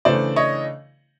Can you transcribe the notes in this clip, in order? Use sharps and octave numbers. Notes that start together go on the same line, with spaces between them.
C#3 E3 A3 D4 C5 D5
C#5 D#5